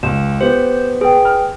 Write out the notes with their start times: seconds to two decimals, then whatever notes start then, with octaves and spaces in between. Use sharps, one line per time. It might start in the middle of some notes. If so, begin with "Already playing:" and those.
0.03 C#2 E7
0.41 B3 G4 C5
1.01 G#4 B4 G5
1.25 F6